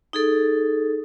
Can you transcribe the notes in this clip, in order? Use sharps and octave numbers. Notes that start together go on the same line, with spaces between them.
D#4 G#4 A4